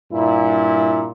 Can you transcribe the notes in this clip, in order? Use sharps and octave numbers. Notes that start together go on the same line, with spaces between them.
G2 A#2 E4